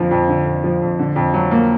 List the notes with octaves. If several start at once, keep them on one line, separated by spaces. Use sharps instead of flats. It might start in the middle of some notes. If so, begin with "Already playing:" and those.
Already playing: F2 D3 F3
F2
D3
F2
F3
F2
D3
F2
F#3
A#3